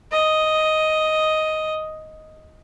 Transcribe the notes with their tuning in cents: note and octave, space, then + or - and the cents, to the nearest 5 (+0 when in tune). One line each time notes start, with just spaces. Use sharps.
D#5 +5